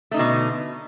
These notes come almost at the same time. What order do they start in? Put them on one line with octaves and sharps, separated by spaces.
A3 D#4 D3 B2